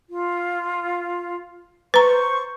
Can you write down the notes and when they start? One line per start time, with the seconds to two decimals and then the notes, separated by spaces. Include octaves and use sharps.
0.09 F4
1.94 B4 C5 A#5 C#6